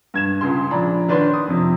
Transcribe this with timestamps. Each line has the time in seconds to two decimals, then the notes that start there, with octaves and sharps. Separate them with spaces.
0.14 G2 G#6 E7
0.41 C#2 C#3 C6
0.71 A#1 D4 A#5 B5
1.09 D#3 D4 B4 C#5 C6
1.34 D#6
1.48 F2 C3